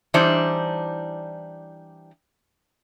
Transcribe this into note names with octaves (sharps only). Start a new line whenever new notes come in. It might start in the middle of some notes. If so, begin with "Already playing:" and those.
E3 G3 D4 D#4 C5